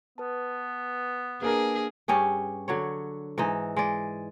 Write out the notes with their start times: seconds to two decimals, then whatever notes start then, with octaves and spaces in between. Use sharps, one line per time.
0.18 B3 B4 A5
1.42 A#3 D4 G#4 A#4 B4 G#5
2.08 G2 C#4 G4 G#4
2.68 D3 F#3 C#5
3.38 G#2 E3 D#4
3.77 G#3 D5